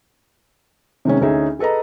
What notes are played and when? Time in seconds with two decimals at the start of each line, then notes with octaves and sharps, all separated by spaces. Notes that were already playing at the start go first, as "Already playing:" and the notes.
1.05 C3 D#3 G#3 C#4
1.21 D2 C#4 D#4 G#4 E5
1.59 G#4 A4 B4 D#5 A#5